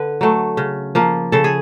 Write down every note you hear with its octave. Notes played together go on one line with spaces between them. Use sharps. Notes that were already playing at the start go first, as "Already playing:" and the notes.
Already playing: D3 B4
F#3 A3
C#3
F3 A#3
C#3 A4
G#4